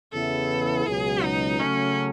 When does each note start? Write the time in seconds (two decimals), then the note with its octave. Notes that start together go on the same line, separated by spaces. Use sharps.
0.13 E2 C#3 E3 B3 E4 A4
0.86 C#2 B2 F#3 G#4
1.23 D#4
1.60 C#3 F#3 A3 C#4